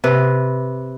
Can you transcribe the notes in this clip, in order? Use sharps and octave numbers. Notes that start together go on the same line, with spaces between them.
C3 B4